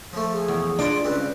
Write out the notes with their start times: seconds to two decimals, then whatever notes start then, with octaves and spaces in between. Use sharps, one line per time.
0.13 F3 A3
0.33 G#4
0.48 E2
0.79 D4 F4 D5 D#5 D6
1.04 C#2 G3 C4 B4